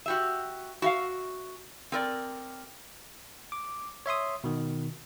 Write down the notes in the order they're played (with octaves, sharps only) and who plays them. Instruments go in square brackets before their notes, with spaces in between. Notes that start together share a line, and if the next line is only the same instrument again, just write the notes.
[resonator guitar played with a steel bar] F#4 G4 E5
F#4 E5 F5
C4 A#4 D5
[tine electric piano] D6
C#5 E5 C6 D#6
B2 D#3